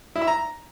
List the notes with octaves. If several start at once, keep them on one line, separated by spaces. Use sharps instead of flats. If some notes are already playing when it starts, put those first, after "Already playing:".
E4
E5
A#5